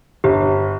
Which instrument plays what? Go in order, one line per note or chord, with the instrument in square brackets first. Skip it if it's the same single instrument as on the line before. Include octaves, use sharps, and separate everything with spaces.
[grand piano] G1 [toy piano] G4